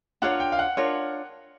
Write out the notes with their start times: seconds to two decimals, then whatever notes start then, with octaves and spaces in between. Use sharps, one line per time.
0.22 D4 F4 A#4 C#5 F#5
0.40 G5
0.52 F5
0.59 F#5
0.77 D4 F4 A#4 C#5